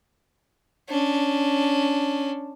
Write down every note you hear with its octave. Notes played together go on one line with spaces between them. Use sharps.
C#4 D4